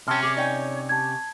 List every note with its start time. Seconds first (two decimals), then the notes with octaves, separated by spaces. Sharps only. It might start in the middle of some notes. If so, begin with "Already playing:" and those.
0.08 C3 C#4 G5 A5 C6 F6
0.22 G#4 A4 D5 D6
0.37 D#4 C#5 D5 G5 G#5
0.89 G4 A5 G#6